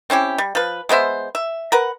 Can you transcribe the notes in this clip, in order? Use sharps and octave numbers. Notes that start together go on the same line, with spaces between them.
C4 C#4 E4 G4
G3
F3 B4
G#3 B3 C5 E5
E5
A#4 B4 F#5